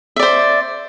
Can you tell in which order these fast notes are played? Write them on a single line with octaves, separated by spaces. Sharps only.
E5 D5 C5